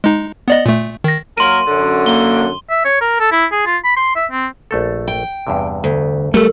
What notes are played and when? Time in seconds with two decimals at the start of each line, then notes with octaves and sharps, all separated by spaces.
0.04 G#3 D#4
0.48 B3 D5 D#5
0.66 A#2 A3
1.04 D#3 A#6
1.38 F#3 A#3 A#4 C6 D#7
1.67 F#2 D3
2.06 A#3 G7
2.70 E5
2.85 C#5
3.01 A#4
3.20 A4
3.32 E4
3.52 G#4
3.66 F4
3.84 B5
3.97 C6
4.16 E5
4.31 C4
4.71 A#1 A3 A4
5.08 G5
5.47 E2 G2 C3
5.84 D2
6.34 G3 A3 A4 A#4